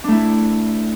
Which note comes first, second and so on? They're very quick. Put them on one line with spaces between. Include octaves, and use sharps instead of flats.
D4 A3 E4